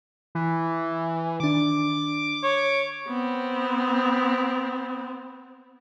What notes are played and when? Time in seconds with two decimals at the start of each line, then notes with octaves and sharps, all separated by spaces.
0.35 E3
1.40 D#3 D4 D6
2.43 C#5
3.08 B3 C4